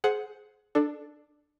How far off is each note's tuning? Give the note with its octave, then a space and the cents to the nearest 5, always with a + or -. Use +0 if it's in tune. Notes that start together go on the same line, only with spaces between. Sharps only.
G#4 +25 C5 +0 F#5 +0
D4 +15 A4 +0